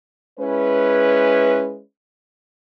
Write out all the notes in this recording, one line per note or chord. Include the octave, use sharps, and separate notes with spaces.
G#3 C#4 E4 B4